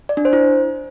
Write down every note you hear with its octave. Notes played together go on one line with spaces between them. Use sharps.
D5
D4
C5
E4